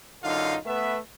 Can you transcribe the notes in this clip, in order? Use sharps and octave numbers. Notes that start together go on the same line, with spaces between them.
F#2 D3 D#4 F4 F5
A3 B3 B4 E5